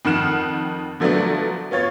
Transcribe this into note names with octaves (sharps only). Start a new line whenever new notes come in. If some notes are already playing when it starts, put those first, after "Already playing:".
F2 D#3 F#5 F6 E7
D3 F3 F#3 A3 B3 D4
B3 F4 C#5 A6